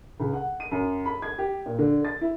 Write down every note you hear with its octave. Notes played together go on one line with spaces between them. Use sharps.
C#2
F#5
D#7
F#2
B5
G#6
G4
A#2
D3
A6
E4